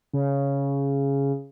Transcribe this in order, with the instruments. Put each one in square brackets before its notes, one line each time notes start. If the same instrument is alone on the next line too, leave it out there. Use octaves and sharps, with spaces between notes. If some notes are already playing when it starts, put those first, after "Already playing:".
[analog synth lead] C#3